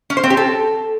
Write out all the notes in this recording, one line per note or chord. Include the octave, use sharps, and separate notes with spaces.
C#4
C5
C4
G4
A4